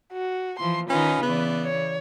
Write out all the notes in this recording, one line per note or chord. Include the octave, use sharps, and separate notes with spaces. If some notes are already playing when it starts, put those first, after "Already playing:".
F#4
E3 F3 C6
D#3 C#4 D#4 F4 B4
C#3 E3 B3 D5
C#5